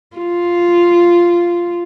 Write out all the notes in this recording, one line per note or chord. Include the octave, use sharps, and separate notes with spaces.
F4